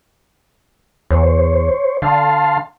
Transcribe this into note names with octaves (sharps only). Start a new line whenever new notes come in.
E2 C5 C#5
D3 F5 A5 C6